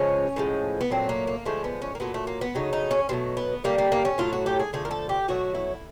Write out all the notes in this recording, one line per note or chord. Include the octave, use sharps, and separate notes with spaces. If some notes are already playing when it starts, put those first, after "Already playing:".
Already playing: C#3 F3 G#3 C#4
A2 F3 G#3
B3
A#2 F#3 A3 C4
A#3
A#3
D3 F3 G#3 A3
B3
C#4
A#3
A#2 F#3 A3 B3
A3
A#3
B3
C#3 F#3 A3 D#4
D#4
C#4
B2 F#3 A3 C4
B3
D3 G3 A#3
A#3
A#3
C#4
A2 F#3 A3 F4
F#4
G4
G#4
D3 F3 A3 G#4
A#4
A4
G4
B2 F#3 A3 F#4
E4